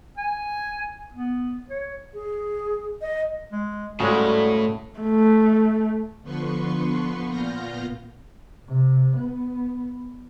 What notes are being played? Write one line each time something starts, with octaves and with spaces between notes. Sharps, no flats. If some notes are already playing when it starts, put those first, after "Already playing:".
G#5
B3
C#5
G#4
D#5
G#3
A2 C#3 G3 G#3 F#4 A4 C#5
A3
D3 F3 B3 B4 C6 C#6
A#2 B3 F4 F6 G6 A#6
C3
B3